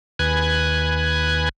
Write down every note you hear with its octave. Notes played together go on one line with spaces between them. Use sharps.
D#2 B4 G#5 F#6 G#6